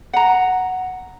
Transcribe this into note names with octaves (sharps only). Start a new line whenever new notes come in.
F#5 A#5